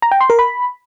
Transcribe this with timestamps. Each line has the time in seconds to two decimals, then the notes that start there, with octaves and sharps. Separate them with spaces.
0.02 A#5
0.11 G5
0.21 C6
0.30 A#4
0.39 B5